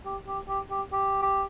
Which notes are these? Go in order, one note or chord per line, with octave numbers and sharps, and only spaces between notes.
G4
G4
G4
G4
G4
G4